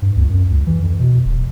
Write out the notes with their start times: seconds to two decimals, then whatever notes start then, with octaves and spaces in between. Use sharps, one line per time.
0.02 G2
0.16 C#2
0.30 F#2
0.50 C#2
0.67 E3
0.82 F2
0.99 B2
1.25 D1